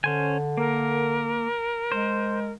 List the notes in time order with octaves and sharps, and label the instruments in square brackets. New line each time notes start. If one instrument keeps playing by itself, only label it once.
[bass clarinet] D3 [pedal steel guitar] C#4 C5 G#5
[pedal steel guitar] A#3 [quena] A#4
[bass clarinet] G#3 [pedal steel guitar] C5